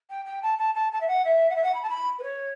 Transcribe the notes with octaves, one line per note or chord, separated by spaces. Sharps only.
G5
G5
A5
A5
A5
A5
E5
F#5
E5
F#5
E5
F#5
B5
A5
B5
B4
C#5